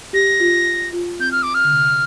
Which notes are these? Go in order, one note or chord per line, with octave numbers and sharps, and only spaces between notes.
G4 A#6
F4
F4
C4 G6
F6
D6
F6
D3
C3